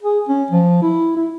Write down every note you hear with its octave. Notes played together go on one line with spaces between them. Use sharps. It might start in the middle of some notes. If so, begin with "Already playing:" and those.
G#4
C#4
F3
E4
E4